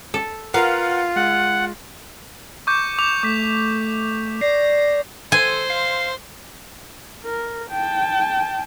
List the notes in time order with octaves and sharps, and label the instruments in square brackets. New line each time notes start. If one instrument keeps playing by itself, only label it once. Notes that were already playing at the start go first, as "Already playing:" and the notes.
[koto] A4
[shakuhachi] F4 [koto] A#4 F5 [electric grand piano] B4 F#5 A#5
[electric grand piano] G#3 [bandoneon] F#5
[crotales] C#6 D6 G6 [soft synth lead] C#7
[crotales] D6 F7
[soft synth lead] A3 [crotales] D6 B6
[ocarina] D5 [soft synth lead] A#6 [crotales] C7
[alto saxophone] A4 [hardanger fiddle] C5 [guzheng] G#5
[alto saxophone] F5
[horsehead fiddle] A#4
G5 A5